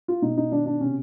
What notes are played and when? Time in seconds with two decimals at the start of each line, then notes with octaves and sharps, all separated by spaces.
0.08 F4
0.22 B2 D#4
0.37 D#4
0.52 D#3 D4
0.66 D4
0.81 C3 C#4